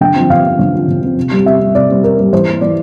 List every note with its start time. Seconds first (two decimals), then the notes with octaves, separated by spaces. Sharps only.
0.01 D3 G5
0.16 F3 C4
0.30 D3 F5
0.44 F3 C4
0.59 D3
0.73 F3 C4
0.88 D3
1.02 F3 C4
1.17 C3
1.31 G3 C4
1.45 C3 E5
1.60 G3 C4
1.75 C3 D5
1.89 G3 C4
2.04 C3 A#4
2.18 G3 C4
2.33 E3 C5
2.47 A#3
2.61 E3 D5